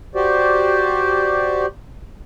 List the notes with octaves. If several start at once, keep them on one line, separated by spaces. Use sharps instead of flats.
F#4 G4 C5 D5